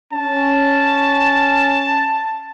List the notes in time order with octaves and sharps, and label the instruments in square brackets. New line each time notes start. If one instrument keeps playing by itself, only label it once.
[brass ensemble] C#4 [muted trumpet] A5